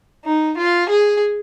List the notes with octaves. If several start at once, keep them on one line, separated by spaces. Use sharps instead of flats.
D#4
F4
G#4